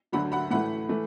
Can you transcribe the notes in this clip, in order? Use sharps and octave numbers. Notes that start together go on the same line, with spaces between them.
D2 D3 F#3 F#5 B5
F#5 B5
A2 E3 A3 F#5 B5
E3 A3